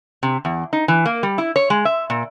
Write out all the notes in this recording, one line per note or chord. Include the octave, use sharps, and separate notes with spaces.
C3
E2
D#4
E3
A#3
G3
E4
C#5
G#3
E5
A#2